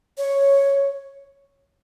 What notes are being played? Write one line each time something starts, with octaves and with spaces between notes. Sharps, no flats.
C#5